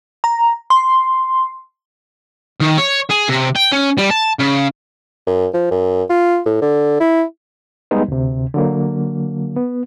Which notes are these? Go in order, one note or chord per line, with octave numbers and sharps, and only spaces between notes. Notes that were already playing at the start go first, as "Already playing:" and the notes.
A#5
C6
D#3
C#5
G#4
C3
G5
C#4
G3
A5
C#3
F#2
F3
F#2
F4
A2
D3
E4
G3 G#3 B3 D#4
D2 C3
D3 F#3 A#3
B3